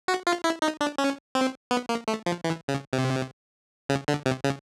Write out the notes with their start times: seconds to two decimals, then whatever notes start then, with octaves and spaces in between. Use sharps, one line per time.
0.08 F#4
0.27 F4
0.44 E4
0.62 D#4
0.81 D4
0.98 C#4
1.35 C4
1.71 B3
1.89 A#3
2.08 A3
2.26 F3
2.44 E3
2.68 C#3
2.93 C3
3.89 C#3
4.08 D3
4.26 C3
4.44 C#3